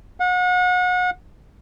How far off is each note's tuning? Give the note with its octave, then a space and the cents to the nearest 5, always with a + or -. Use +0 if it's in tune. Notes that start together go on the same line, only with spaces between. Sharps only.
F#5 -35